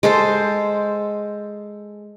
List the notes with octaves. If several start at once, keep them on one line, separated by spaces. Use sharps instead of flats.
G#3 A4 C5